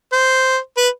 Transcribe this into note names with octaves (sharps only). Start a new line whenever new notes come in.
C5
B4